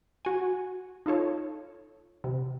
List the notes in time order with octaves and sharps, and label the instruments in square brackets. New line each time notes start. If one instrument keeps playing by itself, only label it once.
[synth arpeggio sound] F#4 G#5
D#4 F4 A4 C#5
C3